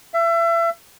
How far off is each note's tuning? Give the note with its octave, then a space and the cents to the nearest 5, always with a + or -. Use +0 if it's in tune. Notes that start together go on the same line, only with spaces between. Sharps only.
E5 +30